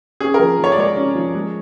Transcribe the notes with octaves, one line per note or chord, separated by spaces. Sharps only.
C#4 G#4
F3 A#4
F3 C#5
D5
G#3 C#5
C#4
F3
G#3